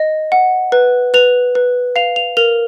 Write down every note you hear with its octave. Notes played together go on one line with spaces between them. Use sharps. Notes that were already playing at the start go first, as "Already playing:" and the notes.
Already playing: D#5
F#5
B4
B4 F7
B4
F5 F7
F7
A#4 F7